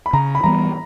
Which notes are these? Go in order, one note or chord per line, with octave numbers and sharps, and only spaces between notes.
B5
C#3 A#5
B5
E3 G3 B3 A#5